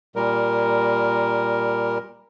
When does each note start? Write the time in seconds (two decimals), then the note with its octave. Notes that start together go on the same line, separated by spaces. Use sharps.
0.16 A#2 G3 A#4